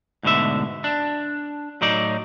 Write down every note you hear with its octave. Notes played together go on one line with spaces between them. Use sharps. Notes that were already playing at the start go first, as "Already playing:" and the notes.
D2 G#2 B2 D3 E5
D4
A2 F#3 D#4 D5